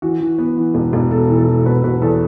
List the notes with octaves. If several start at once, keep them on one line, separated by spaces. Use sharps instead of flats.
E3 F#4
E3
B3
E3
E1
E1
B3 A4
E3
A4
E3
E1 F#4 B4
E1 F#4 B4
E2 A4